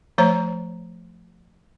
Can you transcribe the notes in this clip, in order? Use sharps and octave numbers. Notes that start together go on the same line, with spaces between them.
F3 A3 C5 C#5 A#5